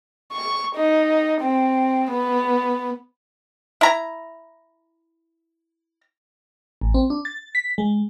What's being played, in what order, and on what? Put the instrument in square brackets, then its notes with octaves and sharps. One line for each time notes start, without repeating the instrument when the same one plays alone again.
[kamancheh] C#6
D#4
C4
B3
[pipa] E4 A#5
[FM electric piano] A1
C4
D4
A6
B6
G#3